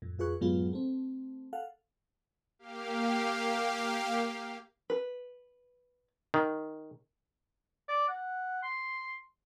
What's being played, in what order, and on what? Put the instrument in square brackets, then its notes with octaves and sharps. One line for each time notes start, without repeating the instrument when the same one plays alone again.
[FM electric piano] F2 A2
F2 F4 G#4 B4 C#6 F#6
F#2 A2 F#3 G#3 B3 F4
A3 C4
A4 F5 F#5
[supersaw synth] A#3 G4 F5
[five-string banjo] B4
[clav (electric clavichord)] D#3
[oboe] D5
F#5
C6